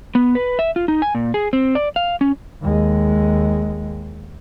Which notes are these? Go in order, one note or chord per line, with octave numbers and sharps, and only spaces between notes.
B3
B4
E5
F4
D#4
G#5
A#2
G#4
C4
D5
F5
C#4
D#2 G#3